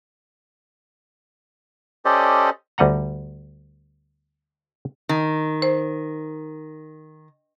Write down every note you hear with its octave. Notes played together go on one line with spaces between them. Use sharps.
C#4 G4 A4 C5 D5 D#5
D2 G3 D#5 F#5 A#5
D#3
C5